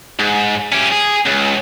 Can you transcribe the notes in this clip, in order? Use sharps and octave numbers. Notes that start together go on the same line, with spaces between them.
G#2
C#4 G4
G#4
C#2